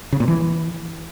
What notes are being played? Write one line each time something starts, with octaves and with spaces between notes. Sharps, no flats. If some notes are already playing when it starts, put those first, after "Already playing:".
C#3
A#2
E3